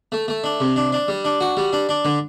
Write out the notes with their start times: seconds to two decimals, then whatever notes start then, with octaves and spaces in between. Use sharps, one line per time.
0.12 A3
0.28 A3
0.44 D4
0.60 C3
0.76 D4
0.92 D4
1.08 G3
1.25 D4
1.41 F#4
1.57 G3
1.73 D4
1.89 D4
2.05 D3